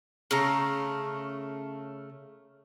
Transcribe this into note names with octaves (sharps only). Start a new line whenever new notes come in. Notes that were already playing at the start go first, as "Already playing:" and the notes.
C#3 A3 A#5